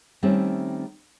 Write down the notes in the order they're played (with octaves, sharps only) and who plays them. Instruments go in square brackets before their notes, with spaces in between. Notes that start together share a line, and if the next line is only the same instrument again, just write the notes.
[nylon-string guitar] D#3 G3 A3 C4 C#4